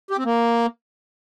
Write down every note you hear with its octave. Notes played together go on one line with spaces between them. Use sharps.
G4
C4
A#3